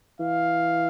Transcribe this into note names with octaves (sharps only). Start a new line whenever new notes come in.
E3 F5